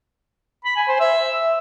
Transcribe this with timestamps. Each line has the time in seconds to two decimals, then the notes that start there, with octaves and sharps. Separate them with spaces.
0.64 B5
0.76 G#5
0.88 C5
1.00 E5